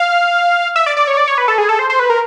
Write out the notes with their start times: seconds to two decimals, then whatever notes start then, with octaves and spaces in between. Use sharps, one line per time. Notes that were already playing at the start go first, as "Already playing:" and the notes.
Already playing: F5
0.76 E5
0.86 D5
0.97 D5
1.07 C#5
1.17 D5
1.28 C#5
1.38 B4
1.48 A4
1.58 G#4
1.69 A4
1.79 C5
1.90 C5
2.00 B4
2.10 A#4